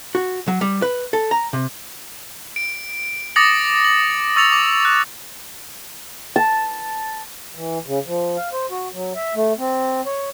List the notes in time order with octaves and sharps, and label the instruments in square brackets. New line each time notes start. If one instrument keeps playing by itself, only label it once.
[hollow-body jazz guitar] F#4
F#3
G3
B4
A4
A#5
C3
[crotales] D7
D6 D#6 A6 A#6 C#7 F#7
F#7
C#6 E6 A6 C#7 F7
D6
F#6
[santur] A5
[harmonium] E3
C#3
F3
F5
C5
F#4
F#3
E5
A3
C4
C#5